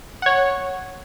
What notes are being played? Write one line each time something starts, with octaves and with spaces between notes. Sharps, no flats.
C#5 F#5